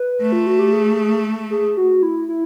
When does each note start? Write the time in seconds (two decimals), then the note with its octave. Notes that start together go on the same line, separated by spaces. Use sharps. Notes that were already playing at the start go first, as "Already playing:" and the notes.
Already playing: B4
0.22 A3
0.32 F4
0.47 F#4
0.59 G4
0.73 G#4
1.51 G#4
1.77 F#4
2.03 E4
2.29 E4